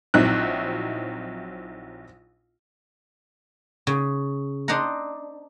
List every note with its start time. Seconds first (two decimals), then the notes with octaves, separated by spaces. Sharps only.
0.14 A#1 F#3 C4 D#4 E4 F#6
3.87 C#3
4.68 D4 C5 D#5 F#5 A#5